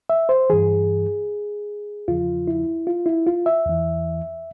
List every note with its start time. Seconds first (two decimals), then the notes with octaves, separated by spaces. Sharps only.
0.10 E5
0.29 C5
0.50 G2 E3 G#4
2.08 E2 C#3 F3 F4
2.48 E4
2.87 F4
3.06 E4
3.27 F4
3.46 E5
3.65 E2 E3